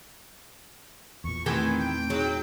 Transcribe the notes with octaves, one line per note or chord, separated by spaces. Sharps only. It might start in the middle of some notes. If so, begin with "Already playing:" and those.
E2 A#2 C#6
D#3 E3 A3 C4 G4 G#5
G5
F#3 D#4 G#4